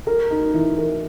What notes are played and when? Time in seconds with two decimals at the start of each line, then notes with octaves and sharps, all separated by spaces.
0.07 A#4
0.31 D#4
0.54 E3
0.78 A#4